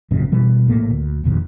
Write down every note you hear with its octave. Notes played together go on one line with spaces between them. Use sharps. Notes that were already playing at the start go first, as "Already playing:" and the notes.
G#1 F#2 A#2 C#3
B2 E3 G3
A#1 A2 A3 A#3
D2
F1 A#1 D#2